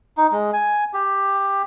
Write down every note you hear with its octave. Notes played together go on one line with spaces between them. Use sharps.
D#4
G#3
G#5
G4